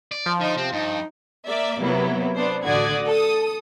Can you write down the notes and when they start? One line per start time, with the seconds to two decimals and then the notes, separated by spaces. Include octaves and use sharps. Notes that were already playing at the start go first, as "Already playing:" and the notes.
0.12 D5
0.26 F3
0.41 D3 D#4
0.58 C3 C4
0.73 G2 D#4
1.47 A#3 D5 E5
1.80 C3 F#3 A#3 B3 E4
2.35 B3 D4 C5
2.64 A1 D3 F#4 D5 D#6 G#6
3.07 A4 D#6